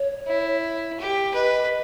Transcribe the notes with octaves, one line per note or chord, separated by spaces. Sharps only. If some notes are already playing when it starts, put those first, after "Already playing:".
Already playing: C#5
E4
G4
B4 D#5